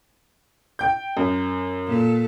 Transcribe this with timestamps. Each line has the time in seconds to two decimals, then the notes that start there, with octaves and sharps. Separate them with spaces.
0.79 G5 G6
1.17 F#2
1.87 A#2 A4